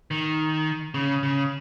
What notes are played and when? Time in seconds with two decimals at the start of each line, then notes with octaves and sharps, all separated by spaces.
0.11 D#3
0.94 C#3
1.23 C#3